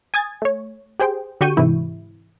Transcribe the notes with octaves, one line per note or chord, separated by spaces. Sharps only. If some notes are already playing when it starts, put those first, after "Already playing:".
G#5 D#6 G#6 A6
A3 C#5
G4 G#4 C5 G5
D3 F#4 G4 C#6 G6 D#7
G#2 C3 E3 E4